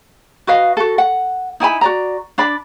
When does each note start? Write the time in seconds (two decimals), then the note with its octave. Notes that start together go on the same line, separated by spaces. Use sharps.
0.47 F#4 B4 D#5 F5
0.77 F#4 A4
0.98 F#5
1.60 D#4 E4 G#5 B5
1.81 F#4 D5 A#5
2.38 D4 D5 B5